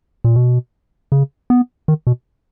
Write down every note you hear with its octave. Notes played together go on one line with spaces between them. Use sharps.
A#2
B2
C#3
B3
D#3
B2